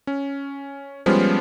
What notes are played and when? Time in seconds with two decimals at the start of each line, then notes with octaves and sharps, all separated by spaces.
0.07 C#4
1.06 F3 G3 G#3 B3 C#4